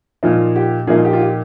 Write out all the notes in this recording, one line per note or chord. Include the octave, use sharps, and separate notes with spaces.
A#2 F3 A#3 D#4 F4
G4
A#2 F3 A#3 D#4 F4 G#4
G4
F4
G4